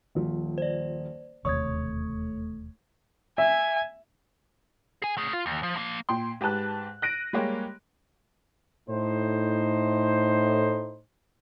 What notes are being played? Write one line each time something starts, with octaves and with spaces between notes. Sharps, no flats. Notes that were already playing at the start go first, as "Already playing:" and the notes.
D#1 F3
C5 D5
E1 D#2 C3 A3 C#5 C#6 D#6 G#6
E5 G#5
G#4 G#5
A3 G#4
F4
D#2
F3
F3 A#3
A#2 G5 C6
G#2 G4 B4 A5 F#6
F#6 A#6 D7 D#7
G3 G#3 A#3 G4 C#5
A2 D#4 C5